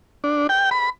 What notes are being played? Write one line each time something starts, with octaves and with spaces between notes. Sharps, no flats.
D4
G5
B5